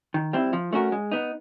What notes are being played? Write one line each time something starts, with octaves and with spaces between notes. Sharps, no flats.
D#3
G3 C4 E4
F3
A3 C#4 F#4 A#4
G#3
B3 D#4